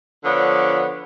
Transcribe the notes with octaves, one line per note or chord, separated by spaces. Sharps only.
D3 F3 B3 D4 C#5